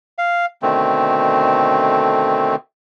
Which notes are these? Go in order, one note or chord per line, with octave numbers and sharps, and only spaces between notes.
F5
B2 D3 D#3 A3 C4